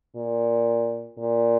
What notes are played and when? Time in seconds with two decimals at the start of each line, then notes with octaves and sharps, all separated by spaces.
0.16 A#2
1.18 A#2